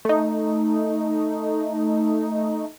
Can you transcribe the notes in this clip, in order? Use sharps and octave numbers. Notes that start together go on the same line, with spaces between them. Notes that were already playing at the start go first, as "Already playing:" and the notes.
A3 D#4